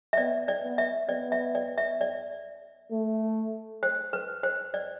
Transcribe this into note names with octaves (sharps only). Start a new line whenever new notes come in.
E5
B3 D5
D5
B3
E5
B3 D5
E5
D5
E5
D5
A3
C5
B4
C5
D5